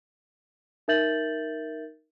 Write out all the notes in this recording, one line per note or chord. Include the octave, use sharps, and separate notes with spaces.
D#4 A#4 E5 G6 A6 F#7